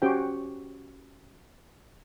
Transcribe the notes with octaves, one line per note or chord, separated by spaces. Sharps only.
C#4 F#4 G4 C5 G5